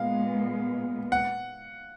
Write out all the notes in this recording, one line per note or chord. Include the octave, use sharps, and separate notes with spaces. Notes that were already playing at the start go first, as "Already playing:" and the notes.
Already playing: A#2 G#3 B3 F5
F#5